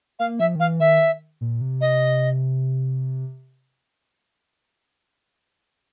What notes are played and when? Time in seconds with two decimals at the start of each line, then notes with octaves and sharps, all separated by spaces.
0.19 A#3 F5
0.40 F3 E5
0.56 D#3
0.60 E3 F5
0.80 D#3 E5
1.41 A#2
1.61 C3
1.81 D#5